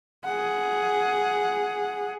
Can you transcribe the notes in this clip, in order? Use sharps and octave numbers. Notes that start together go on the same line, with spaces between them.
G#4 F#5